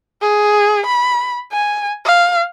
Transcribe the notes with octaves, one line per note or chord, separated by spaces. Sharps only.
G#4
B5
G#5
F5